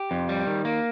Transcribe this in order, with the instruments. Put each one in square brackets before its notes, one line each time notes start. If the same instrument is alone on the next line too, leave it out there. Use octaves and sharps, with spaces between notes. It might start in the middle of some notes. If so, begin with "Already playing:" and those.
Already playing: [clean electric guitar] G4
F2
G3
D#3
A#3